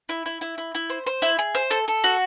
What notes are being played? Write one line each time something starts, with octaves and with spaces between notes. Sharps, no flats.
E4
E4
E4
E4
E4
C5
C5
E4
G#4
C5
A4
A4
F#4